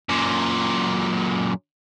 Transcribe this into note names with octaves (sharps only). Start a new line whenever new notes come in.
F#2 A#2